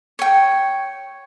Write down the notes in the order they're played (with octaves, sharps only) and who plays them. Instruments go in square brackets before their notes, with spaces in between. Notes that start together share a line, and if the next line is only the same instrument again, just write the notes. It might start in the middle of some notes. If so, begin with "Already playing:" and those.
[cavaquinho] C#5 G5